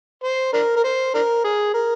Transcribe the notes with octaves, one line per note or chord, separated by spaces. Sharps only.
C5
D4 A#4
A#4
C5
D4 A#4
G#4
A#4